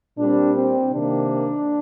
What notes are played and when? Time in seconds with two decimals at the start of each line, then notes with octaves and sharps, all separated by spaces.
0.18 A#2 G3 C4 D4
0.55 C4
0.93 C3 D#3 A#3 D4